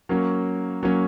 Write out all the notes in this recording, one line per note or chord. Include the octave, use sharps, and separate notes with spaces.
F#3 A#3 C#4
F#3 A#3 C#4